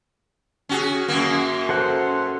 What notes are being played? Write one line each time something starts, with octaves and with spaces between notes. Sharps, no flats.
C#4 F#4 G#4
F#2 F#3 A#3
A4 C5 F#5